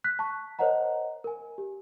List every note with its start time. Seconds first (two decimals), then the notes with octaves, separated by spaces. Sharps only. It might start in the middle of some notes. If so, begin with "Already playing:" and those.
0.04 F#6 B6
0.19 A5 C#6
0.59 A#4 C5 C#5 D#5 F#5 A#5
1.24 A#4 G#5
1.58 G4